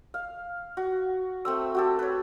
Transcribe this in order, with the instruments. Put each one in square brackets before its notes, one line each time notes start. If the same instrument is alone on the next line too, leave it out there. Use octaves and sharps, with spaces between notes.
[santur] F5
F#4
A3 C4 E6
F#4 G4 A4
B4 C#5